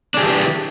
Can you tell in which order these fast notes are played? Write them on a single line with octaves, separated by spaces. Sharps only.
D4 G#4 G4 E3